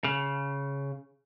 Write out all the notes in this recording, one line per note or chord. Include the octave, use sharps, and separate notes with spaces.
C#3